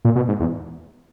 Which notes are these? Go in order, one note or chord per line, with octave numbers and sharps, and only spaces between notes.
A#2
B2
G#2
E2